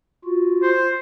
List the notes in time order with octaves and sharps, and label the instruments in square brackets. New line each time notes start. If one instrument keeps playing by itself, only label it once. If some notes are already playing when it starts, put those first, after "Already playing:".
[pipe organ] F4 F#4
[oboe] C5